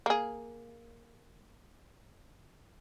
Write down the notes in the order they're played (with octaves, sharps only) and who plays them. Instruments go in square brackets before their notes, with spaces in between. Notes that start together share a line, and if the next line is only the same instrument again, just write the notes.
[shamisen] A#3 G#4